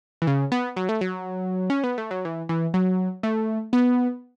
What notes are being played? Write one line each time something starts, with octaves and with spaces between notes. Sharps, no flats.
E3
C#3
B3
F#3
A3
F#3
C#4
B3
A3
F#3
E3
E3
F#3
A3
B3